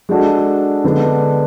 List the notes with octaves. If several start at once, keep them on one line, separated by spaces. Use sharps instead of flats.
G#3 D4 F#4 A4
D3 G#3 B3 D4